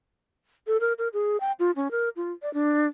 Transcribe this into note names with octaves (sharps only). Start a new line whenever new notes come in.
A4
A#4
A#4
G#4
G5
F4
C#4
A#4
F4
D5
D4